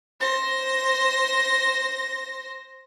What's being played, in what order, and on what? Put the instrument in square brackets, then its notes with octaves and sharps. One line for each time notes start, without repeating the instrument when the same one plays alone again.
[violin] C5 A#6